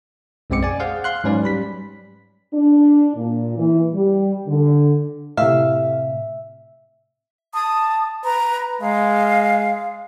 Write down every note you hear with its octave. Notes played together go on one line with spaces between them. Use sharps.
B1 F#2 G#3 C4 D6 C#7
D5 G#5
G#4 C5 F5 F#5
F5 C6 F#6
G#2 F#3 C#4 B4 D5
G3 B5 B6
D4
A#2
E3
G3
D3
A2 C3 E5 F5
A5 D#6
B4 A#5
G#3 F5